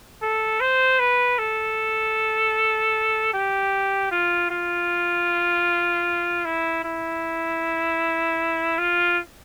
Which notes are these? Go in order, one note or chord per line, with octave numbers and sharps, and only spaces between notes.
A4
C5
B4
A4
G4
F4
F4
E4
E4
F4